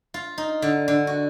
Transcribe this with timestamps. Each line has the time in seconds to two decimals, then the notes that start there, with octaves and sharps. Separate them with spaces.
0.14 F4
0.38 D#4
0.62 D3
0.88 D3
1.07 F#4